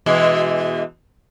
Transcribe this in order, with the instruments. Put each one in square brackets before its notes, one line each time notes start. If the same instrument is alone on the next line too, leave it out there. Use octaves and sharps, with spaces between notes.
[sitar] B2 E3 G#3